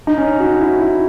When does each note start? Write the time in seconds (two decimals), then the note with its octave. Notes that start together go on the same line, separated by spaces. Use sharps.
0.07 D#4
0.18 C#4
0.40 F#4
0.60 E4
0.81 E4